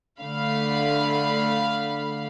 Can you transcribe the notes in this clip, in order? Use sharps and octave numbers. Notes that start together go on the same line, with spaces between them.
D3 A3 F5 B5